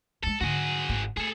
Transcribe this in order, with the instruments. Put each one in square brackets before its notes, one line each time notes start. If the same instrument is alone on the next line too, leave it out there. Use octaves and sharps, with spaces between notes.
[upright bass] F#3 G#3 [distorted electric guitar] A4
[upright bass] G#2 D3 [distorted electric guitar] F#4 G#4
[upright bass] G#1
[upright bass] A3 [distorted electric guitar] G#4 A4